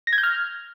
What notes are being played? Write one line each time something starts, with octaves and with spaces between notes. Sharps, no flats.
A#6
G#6
G6
F6